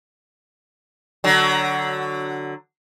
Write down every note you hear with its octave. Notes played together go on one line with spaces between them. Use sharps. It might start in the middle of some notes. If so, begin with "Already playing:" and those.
D3 F#3